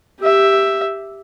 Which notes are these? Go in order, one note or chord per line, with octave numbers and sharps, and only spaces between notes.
G4 E5